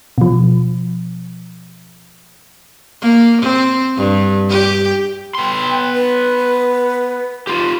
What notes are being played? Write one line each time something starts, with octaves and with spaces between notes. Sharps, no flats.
B2 F3
A#3
C4
G2
G4
B3 G5 C6
B4
F4 G4 C6